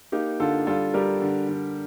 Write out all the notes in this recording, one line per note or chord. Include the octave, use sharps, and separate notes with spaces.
A#3 D#4 G4
D3 F4 A4
G3 F4 A4
G3 G4 A#4
D3
D3